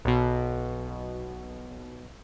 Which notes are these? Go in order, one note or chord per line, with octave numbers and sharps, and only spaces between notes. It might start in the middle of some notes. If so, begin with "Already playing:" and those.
B1 B2